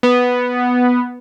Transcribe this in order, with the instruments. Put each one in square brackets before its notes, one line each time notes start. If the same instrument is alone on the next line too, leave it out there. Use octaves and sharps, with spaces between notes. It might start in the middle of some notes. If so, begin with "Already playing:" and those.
[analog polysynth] B3